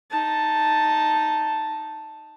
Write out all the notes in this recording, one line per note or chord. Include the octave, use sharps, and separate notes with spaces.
D#4 A5